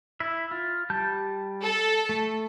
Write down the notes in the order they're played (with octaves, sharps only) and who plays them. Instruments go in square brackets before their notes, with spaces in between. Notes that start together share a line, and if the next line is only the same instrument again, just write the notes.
[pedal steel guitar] E4 E5
F4
G3 A5 G6
[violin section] A4
[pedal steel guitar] A3